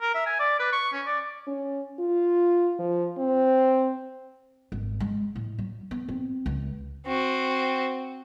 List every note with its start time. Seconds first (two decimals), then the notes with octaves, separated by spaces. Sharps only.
0.02 A#4
0.15 E5
0.26 G#5
0.39 D5
0.60 B4
0.73 C#6
0.93 C#4
1.06 D5
1.47 C#4
2.00 F4
2.79 F3
3.18 C4
4.72 G#1
5.00 G#3
5.36 A2
5.59 F#3
5.91 B3
6.09 C4
6.46 C#2
7.06 C4 F#4